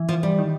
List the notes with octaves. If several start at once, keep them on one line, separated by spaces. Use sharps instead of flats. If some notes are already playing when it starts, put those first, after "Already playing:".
Already playing: E3
F3
G3
D#3